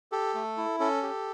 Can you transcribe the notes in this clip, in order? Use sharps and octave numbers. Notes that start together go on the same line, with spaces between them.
G4 A4
A3
E4
C#4 A4
G4